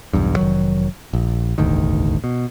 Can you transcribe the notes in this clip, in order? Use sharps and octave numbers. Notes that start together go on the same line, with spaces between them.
B1 E2 G2
F1 D#3 F#3
A#1
E1 A1 D2 D#3
B2